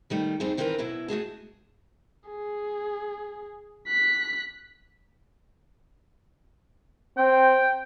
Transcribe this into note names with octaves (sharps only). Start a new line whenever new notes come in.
D#3 G3 A3
F2 G3 C4 D#4 G#4
D#3 E3 C4 D4 A#4 B4
B2 F#3 E4
A3 F#4 G#4 A5
G#4
F#6 B6
C4 G5